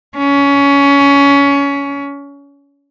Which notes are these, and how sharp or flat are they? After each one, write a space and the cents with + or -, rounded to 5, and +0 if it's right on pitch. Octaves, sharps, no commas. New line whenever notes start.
C#4 +20